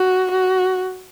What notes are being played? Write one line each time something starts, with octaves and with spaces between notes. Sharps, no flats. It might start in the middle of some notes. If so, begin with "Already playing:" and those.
Already playing: F#4
F#4